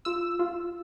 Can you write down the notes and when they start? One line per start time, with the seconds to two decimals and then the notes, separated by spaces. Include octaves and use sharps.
0.05 F4 E6
0.39 F4